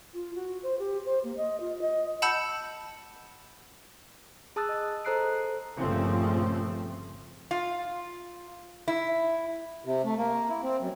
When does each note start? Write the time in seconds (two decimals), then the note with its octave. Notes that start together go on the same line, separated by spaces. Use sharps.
0.14 F4
0.35 F#4
0.63 C5
0.79 G4
1.06 C5
1.24 A#3
1.37 D#5
1.60 F4
1.81 D#5
2.22 F#5 A5 B5 E6 G6 C#7
4.56 G#4 A5 D#6 E6 F#6 A6
4.69 D#5
5.05 A4 C5 A#5 F#6 C7 D7
5.77 G1 A#2 C#3 F3 A3 C4
7.51 F4
8.88 E4
9.85 C3
10.04 A3
10.18 A#3
10.49 E4
10.63 C4
10.79 F#2